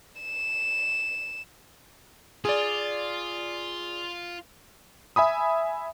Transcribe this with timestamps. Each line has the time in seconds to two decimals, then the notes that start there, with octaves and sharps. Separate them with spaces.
0.21 E7
2.45 F4 G#4 D5
5.16 E5 G#5 B5 D#6